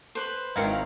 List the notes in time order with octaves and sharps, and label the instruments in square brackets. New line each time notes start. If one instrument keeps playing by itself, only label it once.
[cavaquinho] B4 C5
[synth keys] G#1 F5 A#5 [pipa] D#3 E4